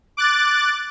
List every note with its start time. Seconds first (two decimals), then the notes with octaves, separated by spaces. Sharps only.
0.17 D6 F#6 A6